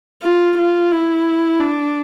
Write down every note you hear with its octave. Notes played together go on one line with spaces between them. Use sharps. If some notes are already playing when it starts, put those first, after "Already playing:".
F4
F4
E4
D4